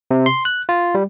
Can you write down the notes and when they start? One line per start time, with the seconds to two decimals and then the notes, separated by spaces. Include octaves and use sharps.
0.11 C3
0.26 C6
0.45 F#6
0.69 F4
0.95 G3